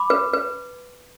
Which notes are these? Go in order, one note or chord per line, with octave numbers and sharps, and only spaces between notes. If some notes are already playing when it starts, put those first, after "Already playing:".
Already playing: B5 D6
B4
B4